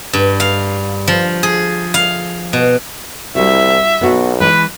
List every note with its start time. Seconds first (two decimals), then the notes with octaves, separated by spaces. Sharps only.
0.13 G2
0.40 F5
1.08 F3
1.43 G#4
1.94 F5
2.53 B2
3.35 C2 G3 E4 F#4 E5
4.01 B1 B3 F#4
4.40 E3 G#3 B4